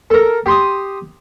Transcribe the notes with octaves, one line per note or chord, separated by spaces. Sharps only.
A4 A#4
G4 C6 D#6